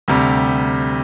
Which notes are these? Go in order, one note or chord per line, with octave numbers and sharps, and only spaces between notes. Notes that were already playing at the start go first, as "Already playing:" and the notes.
D2 C3 G3